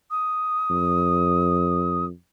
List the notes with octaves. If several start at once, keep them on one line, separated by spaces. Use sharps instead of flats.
D#6
F2